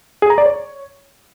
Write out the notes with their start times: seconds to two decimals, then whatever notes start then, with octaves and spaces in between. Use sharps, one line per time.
0.22 G#4
0.30 A#5
0.38 D5
0.46 C#5